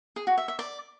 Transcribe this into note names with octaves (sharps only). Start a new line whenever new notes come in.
G#4
F#4
E5
E5
D5